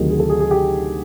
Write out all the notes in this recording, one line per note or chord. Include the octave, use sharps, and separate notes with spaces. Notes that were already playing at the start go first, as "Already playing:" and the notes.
Already playing: D2 C3 D#3 F#3 G#4
G#4
A4
G#4
G#4
G4